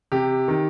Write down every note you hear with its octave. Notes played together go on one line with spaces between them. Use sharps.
C3 G4
D#3